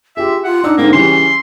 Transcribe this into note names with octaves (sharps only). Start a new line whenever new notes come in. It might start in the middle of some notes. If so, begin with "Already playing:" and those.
F4 G4 G#4 E5
F4 F#5
D4 D#4 E6
G#2 D3 A#3 C4
C#3 E3 G3 C#4 C6